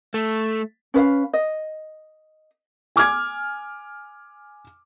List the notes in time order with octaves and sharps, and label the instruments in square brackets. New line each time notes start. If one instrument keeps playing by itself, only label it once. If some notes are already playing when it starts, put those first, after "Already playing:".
[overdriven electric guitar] A3
[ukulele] C#4 B4 D5 F5
D#5
[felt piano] G#5 D6 F6 G#6